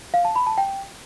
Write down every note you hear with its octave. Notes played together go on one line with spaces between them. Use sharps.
F5
A5
B5
A5
G5